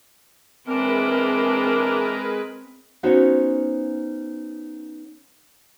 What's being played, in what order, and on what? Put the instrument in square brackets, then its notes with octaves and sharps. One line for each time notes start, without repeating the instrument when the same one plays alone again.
[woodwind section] E3 D4 [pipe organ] G#3 B4 [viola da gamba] C4 [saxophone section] A#4
[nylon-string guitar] B3 C#4 D#4 F#4 C5 C#5